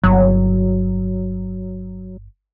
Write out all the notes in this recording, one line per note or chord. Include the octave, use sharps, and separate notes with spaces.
G1 F#3